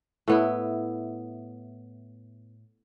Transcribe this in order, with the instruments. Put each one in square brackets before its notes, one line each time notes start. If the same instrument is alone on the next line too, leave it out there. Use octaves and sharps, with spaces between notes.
[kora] A2 B3 E4